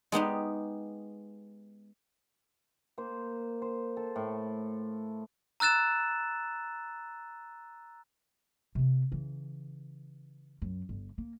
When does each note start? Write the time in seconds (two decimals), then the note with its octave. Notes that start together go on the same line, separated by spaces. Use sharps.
0.12 G#3 B3 D#4 G4
2.98 A#3 C5
3.62 C5
3.97 A4
4.16 A2 A4
5.60 A#5 E6 F#6 A6 E7
8.75 C3 B3
9.12 C#3 E3
10.62 F#2
10.89 G1
11.18 A#3